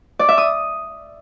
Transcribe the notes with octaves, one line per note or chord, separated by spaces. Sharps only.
D5
E5
D#6